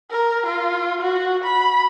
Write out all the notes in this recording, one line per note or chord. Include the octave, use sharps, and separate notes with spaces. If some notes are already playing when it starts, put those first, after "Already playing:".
A#4
F4
F#4
B5